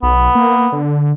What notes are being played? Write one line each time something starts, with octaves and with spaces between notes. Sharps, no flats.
B1 B3
A#3
D3